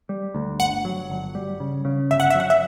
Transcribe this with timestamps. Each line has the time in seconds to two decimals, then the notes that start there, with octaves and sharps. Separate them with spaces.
0.09 G3
0.35 D2
0.60 G1 F#5
0.85 F#3
1.10 G1
1.35 G3
1.60 C#3
1.85 C#3
2.10 G1 E5
2.20 F#5
2.30 F#3 E5
2.40 F#5
2.50 E5